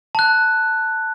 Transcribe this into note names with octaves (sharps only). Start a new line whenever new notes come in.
A5 F#6